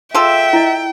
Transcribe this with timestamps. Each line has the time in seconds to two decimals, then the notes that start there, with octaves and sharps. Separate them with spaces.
0.14 F4 G#4 A4 E5 G5
0.53 E4 D#5